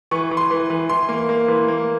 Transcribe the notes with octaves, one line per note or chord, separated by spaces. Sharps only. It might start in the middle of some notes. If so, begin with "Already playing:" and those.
E3 C#6
E3
C6
E3
E3
E3 C6
A#3
A#3
E3
A#3